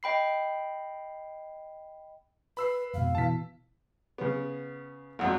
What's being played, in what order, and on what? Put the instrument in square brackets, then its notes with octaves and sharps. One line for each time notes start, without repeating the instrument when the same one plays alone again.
[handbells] D#5 G5 B5 C7
[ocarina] B4 [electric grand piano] B5 E6 C7
[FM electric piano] F2 G#2 B2 [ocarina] F5
[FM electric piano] B2 E3 [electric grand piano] A5 B6
[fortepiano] C#3 B3
[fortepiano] G#1 F2 F#3 [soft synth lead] F#5